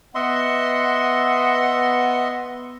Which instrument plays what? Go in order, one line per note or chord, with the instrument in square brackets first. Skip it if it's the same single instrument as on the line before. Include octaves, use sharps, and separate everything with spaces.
[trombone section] B3 [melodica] D#5 E5 C6 [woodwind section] F#5